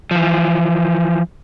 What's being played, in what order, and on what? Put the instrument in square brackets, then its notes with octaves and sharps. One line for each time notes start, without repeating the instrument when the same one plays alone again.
[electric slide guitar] E3 F3